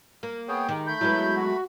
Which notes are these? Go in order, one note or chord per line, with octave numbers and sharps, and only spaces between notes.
A#3
B3 G#4 C#5 G5
D#3 G#3 G4
A3 B5 G6
F#3 G#3 B3 E4
F#4